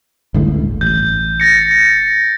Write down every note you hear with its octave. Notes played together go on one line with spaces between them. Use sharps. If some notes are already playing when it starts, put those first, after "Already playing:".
G1 C#2 A2
A1 G6
A6 A#6 C#7
C#7